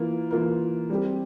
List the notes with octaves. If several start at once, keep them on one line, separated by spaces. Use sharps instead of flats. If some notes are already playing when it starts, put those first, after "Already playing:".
Already playing: E3 A#3 F4 A#4
E3 A#3 F4 A#4
G3 C4 G4